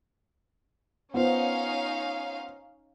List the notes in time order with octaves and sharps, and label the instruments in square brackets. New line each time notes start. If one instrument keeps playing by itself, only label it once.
[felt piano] B3 F4 C5 [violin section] C#4 D#4 F5